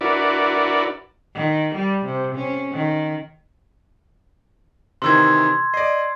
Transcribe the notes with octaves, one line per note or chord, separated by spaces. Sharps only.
D4 E4 F#4 A#4 B4 D5
D#3
G3
C3
C#4
D#3
C3 D#3 E3 C6 E6 G#6
D5 D#5 C7